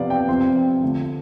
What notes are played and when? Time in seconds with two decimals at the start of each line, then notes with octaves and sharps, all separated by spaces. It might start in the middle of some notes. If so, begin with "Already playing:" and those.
Already playing: C3 F3 B3 D5 F5
0.10 G5
0.28 C3 F3 C4 F4 C6
0.82 D3 A3 D4 F4